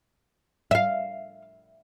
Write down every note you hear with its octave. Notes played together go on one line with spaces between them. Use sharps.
E5 F5